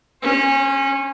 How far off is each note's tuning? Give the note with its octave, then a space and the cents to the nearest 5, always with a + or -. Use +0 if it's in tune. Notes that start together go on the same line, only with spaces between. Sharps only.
C#4 -20 C5 +30